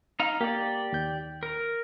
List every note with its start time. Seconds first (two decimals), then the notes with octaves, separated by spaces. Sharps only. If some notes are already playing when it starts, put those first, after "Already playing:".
0.20 D#4 F5
0.41 A#3 G4 D5
0.93 D#2 G6
1.43 A#4